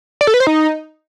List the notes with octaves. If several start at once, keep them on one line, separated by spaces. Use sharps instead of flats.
D5
A4
B4
C5
D#4